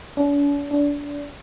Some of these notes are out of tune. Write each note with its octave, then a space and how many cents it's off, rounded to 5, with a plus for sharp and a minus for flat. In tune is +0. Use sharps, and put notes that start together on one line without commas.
D4 -45
D4 -25